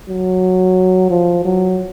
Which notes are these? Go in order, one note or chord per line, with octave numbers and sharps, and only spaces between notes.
F#3
F3
F#3